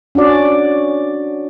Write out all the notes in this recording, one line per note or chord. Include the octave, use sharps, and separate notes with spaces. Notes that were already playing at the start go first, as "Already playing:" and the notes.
C#4 D4 F#4 D5